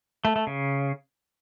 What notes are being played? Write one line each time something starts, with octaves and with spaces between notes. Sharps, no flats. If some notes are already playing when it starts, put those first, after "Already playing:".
A3
A3
C#3